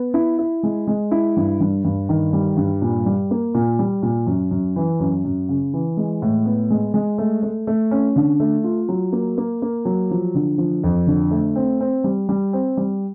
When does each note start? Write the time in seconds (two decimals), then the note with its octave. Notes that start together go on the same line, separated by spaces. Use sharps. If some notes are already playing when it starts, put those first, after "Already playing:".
Already playing: B3
0.14 E4
0.38 E4
0.63 G#3
0.87 G#3
1.11 E4
1.37 G2
1.60 G2
1.85 G2
2.09 D#3
2.33 G3
2.57 G2
2.81 A#2
3.06 G3
3.31 A#3
3.54 A#2
3.79 G3
4.02 A#2
4.27 F#2
4.51 F#2
4.76 E3
5.00 F#2
5.25 F#2
5.49 C#3
5.74 E3
5.97 G#3
6.22 A2
6.46 B3
6.70 G#3
6.94 G#3
7.18 A3
7.43 A3
7.67 A3
7.91 C#4
8.16 D3
8.40 A3
8.64 F4
8.89 F#3
9.12 A#3
9.38 A#3
9.62 A#3
9.85 F#3
10.11 F3
10.35 D3
10.58 F3
10.83 F2
11.07 D3
11.31 A3
11.56 C4
11.81 C4
12.04 G3
12.29 G3
12.53 C4
12.77 G3